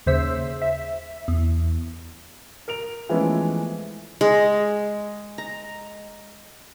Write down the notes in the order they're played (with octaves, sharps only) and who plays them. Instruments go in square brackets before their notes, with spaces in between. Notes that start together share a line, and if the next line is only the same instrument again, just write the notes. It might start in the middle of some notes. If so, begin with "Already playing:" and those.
[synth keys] D#2 C#3 C5 E5 E6
E5
E2
[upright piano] A#4 D7 F7
E3 F3 G#3 A3 B3 C#4
[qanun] G#3
A#5